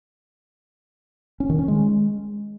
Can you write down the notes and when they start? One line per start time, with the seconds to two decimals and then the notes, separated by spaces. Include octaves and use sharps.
1.40 C#4
1.50 D#3
1.59 C#4
1.68 G#3